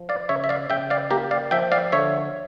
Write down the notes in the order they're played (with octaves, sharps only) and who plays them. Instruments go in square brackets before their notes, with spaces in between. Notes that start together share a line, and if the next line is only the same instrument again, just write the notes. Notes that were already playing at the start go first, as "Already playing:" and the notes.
Already playing: [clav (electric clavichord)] F3
D5 F5
C#3 C#5 E5
E5
D5 F5
C#3 E5 G5
D5 F5
A#3 G4 A#4
D5 F5
F3 E5 G5
D5 F5
D3 C#5 E5